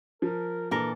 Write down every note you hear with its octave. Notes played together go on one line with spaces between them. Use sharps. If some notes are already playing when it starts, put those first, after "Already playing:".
F3 A#4
A#2 E3 D4 A4 A#4